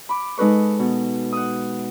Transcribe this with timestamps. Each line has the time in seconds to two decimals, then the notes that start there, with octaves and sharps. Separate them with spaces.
0.09 B5 D6
0.38 G#3 D#4 A4 B4 C#6
0.79 B2
1.32 F#5 D#6